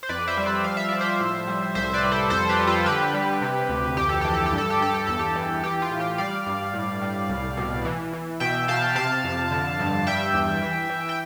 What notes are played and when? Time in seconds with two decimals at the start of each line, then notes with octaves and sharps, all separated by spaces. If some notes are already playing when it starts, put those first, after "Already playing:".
0.03 C5
0.09 F2 B4 D5
0.28 C5 E5
0.37 G3
0.46 B4 D5
0.64 F3 F5
0.77 E5
0.89 F3 D5
1.01 C5 E5
1.20 A2
1.47 G3
1.75 C2 C5 E5
1.93 B4 D5
2.03 G3
2.12 A4 C5
2.30 F2 A4 C5
2.49 G4 B4
2.59 G3
2.67 F4 A4
2.86 D3 G4 B4
3.14 G3
3.41 C3
3.69 D2
3.97 F2 G4
4.09 A4
4.21 E3 G4
4.34 A4
4.46 G4
4.52 G2
4.58 A4
4.70 G4
4.80 G2 A4
4.94 G4
5.07 E2 A4
5.19 G4
5.36 E3
5.64 E3 G4
5.82 F4
5.91 A2
6.00 G4
6.18 G3 D5 F5
6.46 G2
6.74 A2
7.01 G3
7.29 C2
7.57 B2
7.85 E3
8.13 E3
8.40 B2 E5 G5
8.68 B2 F5 A5
8.95 C3 F5 A5
9.24 F2
9.51 D3
9.79 G2
10.07 G3 E5 G5
10.34 E2
10.62 E3
10.89 E3
11.09 G5